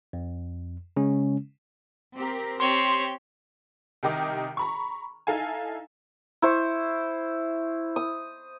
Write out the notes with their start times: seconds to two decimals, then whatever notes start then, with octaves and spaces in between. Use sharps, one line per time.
0.13 F2
0.96 C#3 G#3 C#4
2.16 C4 G4 A#4
2.60 C4 G4 C#5 C6
4.03 C2 D#3 G4 D#5 D6
4.57 A#5 B5 C#6
5.27 D#4 E4 A4 F5 G#5
6.42 E4 C5 C#6
7.96 D#6